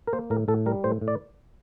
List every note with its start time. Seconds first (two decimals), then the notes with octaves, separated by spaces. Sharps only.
0.07 A#4
0.13 A#3 C5
0.30 A2 A#4
0.48 A2 A4
0.66 G3 A#4
0.84 A2 C5
1.01 A2
1.08 D5